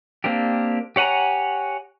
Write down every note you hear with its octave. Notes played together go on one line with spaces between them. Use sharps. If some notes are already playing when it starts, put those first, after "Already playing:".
A#3 C4 D4 G4
G4 C#5 F#5 G#5 A#5